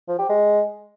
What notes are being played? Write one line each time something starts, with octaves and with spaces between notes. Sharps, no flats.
F3
G4
G#3